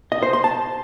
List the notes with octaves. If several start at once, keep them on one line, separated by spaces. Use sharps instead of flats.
D#5
C5
C6
A5